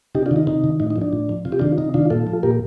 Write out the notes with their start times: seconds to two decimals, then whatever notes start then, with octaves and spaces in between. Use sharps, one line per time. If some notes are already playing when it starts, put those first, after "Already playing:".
0.15 C3 D#4 G4
0.26 D4 F4
0.31 D#3 D#4
0.47 C3 D#4
0.64 D#3
0.80 A2 D#4
0.90 D#4
0.96 F3
1.01 D4
1.13 A2
1.29 F3
1.45 C3 F4
1.52 G4
1.59 D#3 D4 F4
1.78 C3 D#4
1.94 D#3 D4 F4
2.10 A#2 F4 A4
2.27 F3
2.43 A#2 G4 A#4